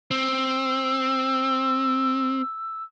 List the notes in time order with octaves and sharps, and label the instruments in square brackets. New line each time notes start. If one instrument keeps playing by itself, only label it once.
[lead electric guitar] C4 [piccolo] E6